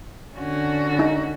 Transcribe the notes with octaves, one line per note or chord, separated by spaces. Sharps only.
D3 C#4 F#4
D#4